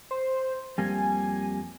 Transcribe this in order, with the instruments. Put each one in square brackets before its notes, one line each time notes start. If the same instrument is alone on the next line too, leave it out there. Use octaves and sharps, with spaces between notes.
[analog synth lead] C5
[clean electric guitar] F2 G3 A#3 [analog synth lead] G#5